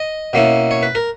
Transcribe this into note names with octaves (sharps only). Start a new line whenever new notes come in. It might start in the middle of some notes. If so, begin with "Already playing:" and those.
Already playing: D#5
B2 A#3 C#4 E4
C#5
B4
A#4